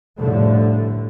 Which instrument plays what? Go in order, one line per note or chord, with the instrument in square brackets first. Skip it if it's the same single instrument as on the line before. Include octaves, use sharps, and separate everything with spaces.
[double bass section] F1 A2 D3 F3 G3 A3